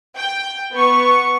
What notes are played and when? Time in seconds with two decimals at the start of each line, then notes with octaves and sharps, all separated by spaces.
0.17 G5
0.72 B3 C#6